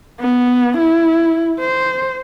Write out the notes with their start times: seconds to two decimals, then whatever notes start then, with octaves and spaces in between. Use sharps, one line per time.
0.21 B3
0.78 E4
1.60 C5